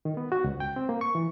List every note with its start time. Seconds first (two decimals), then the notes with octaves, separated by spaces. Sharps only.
0.05 D#3
0.17 B3
0.32 F#4
0.44 C#2
0.60 G5
0.76 C4
0.89 A#3
1.01 C#6
1.15 E3